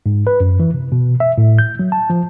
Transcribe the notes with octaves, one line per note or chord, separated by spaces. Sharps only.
G#2
B4
F#2
E3
C3
B2
E5
A2
G6
F#3
A5
F3